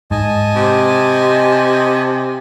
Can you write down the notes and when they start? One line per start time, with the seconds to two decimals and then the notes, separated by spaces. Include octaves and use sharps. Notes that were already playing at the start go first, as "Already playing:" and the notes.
0.11 G#2 D#5 G#5 A5
0.56 C3